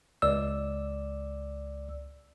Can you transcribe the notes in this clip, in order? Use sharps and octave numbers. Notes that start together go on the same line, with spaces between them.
C#2 D5 E6